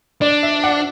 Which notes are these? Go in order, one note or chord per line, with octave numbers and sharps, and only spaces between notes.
D4 D5
E5
F#5